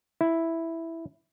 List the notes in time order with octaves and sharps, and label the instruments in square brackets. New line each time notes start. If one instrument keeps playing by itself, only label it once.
[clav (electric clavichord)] E4